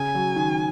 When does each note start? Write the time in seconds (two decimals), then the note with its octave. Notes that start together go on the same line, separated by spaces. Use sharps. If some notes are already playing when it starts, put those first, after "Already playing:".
Already playing: C#3 G#5
0.15 F#3
0.36 D#3